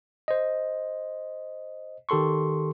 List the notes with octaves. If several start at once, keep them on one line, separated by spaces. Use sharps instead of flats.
C5 D#5
D#3 G4 A4 C6 C#6